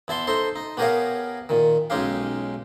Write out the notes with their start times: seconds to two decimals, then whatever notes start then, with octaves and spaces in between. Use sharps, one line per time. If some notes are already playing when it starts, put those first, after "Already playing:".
0.08 E2 E4 A5 C6
0.27 D#4 A4 C5 C6
0.56 D#4
0.77 B3 G4 G#4 A#4 C#5 F5
1.49 A#2 D#3
1.90 B1 G#3 C#4 D#4 G4 F5